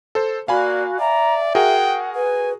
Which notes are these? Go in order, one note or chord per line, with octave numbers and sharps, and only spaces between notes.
A4 C5
A#3 F#4 D5 F5 G#5 B5
D5 E5 A#5
F#4 G#4 A#4 F#5 G5
B4 G#5